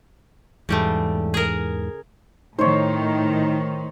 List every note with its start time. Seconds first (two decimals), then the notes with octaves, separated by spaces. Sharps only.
0.69 E2 G#2 C#3 E3 G3 A3
1.34 G#4 A#4
2.59 A2 D#3 D#4 C5 C#5